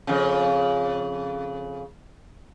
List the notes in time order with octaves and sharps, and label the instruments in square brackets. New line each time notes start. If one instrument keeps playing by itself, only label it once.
[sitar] F2 C#3